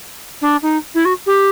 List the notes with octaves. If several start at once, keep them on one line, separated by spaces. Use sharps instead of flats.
D4
D#4
E4
F#4
G4